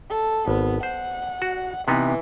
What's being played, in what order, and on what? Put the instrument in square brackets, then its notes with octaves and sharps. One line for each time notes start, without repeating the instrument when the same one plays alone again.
[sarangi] A4
[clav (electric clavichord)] G#1 [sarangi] B3
[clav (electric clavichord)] C5 [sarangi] F#5
[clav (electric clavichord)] F#4
[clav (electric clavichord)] C3 B3 D#4 [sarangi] E3